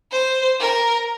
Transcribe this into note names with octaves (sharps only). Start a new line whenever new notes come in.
C5
A#4